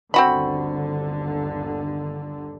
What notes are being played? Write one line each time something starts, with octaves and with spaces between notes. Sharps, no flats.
G1 D#2 D3 C4 F#4 B5